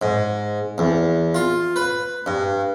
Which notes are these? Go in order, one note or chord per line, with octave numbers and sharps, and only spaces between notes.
G#2
E2
F4
B4
G2